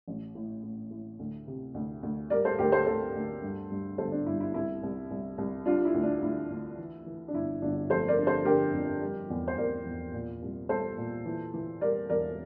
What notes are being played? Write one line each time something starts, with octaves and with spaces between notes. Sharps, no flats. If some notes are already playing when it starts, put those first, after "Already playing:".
A1
A2
A2
A2
D2
C3
D2
D2
G3 A#4 D5
A4 C5
D2 G4 A#4
A4 C5
D2 A4 C5
D2
G2
G2
G1 A4 C5
D4
G2 E4
E4
C2 E4
C2
C2
C2
G3 D4 F4
E4
D2
D4
D2 E4
D2
E3
E3
D4
G1 E4
G1 D4
F1 A4 C5
A#4 D5
D3
A4 C5
D3 G4 A#4
F2
G3
E2
C5
E2 A#4 D5
E2
A#2
C2
G3 A4 C5
A#2
E3
E3
G3 A#4 D5
E1 A#4 D5